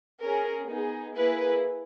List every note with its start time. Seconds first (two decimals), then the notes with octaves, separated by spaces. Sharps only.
0.21 C#4 G#4 A#4
0.69 B3 D#4 G#4
1.16 A#3 E4 G#4 B4